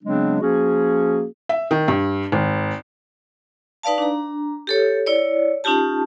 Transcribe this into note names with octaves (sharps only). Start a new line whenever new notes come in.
C#3 F#3 G#3 B3 C4 D4
F3 A#3 C#4 F#4 G#4
E5
D#3
G2
G#1
D#4 B4 D5 F5 A5
D4 A#5
G4 A4 C#5
E4 C#5 D5
C#4 D#4 F4 G4 A5